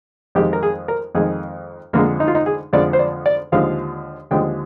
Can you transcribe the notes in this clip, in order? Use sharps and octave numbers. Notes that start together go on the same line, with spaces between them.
F2 D#3 G#3 G4
A#4
G#4
A#4
F2 D#3 G#3 G#4
F2 D3 F3 G#3 A#3
D#4
F4
D#4
G#4
F2 D3 F3 G#3 D5
C5
D5
D5
D#2 D3 F3 G#3 F5
D#2 D3 F3 G#3 G5